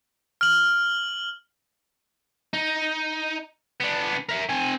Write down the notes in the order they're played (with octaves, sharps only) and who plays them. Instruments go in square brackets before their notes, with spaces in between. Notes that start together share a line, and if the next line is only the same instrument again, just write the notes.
[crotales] F6 F#7
[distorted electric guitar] D#4
B3 D4
A#4 E5
C4 G#5